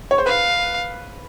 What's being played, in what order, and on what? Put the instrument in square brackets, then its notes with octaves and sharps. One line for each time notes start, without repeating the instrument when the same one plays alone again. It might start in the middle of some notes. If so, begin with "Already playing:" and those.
[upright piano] C#5
C5
[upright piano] B4 [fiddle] F5